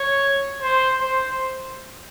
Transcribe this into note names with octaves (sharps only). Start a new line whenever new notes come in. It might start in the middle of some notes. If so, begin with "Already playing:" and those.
Already playing: C#5
C5
C5